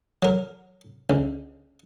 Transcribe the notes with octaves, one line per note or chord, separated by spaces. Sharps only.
F#3 A#4
C#2